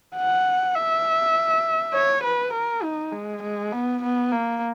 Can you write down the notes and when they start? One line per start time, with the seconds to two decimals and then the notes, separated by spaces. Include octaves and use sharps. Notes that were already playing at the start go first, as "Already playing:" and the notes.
0.15 F#5
0.76 E5
1.94 C#5
2.23 B4
2.53 A#4
2.83 D#4
3.12 G#3
3.42 G#3
3.72 B3
4.02 B3
4.31 A#3